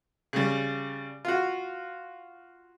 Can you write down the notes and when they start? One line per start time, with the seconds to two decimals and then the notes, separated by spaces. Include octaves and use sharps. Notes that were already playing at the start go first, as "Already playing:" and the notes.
0.33 C#3 G3
1.25 F4 F#4